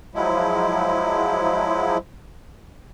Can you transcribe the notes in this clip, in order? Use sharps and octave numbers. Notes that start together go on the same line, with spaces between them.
F3 F#3 G#3 E4